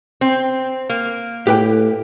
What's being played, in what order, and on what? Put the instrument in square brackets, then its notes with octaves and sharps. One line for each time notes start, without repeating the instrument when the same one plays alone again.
[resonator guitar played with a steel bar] C4
A#3
[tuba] A2 [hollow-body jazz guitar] G4 B4 G5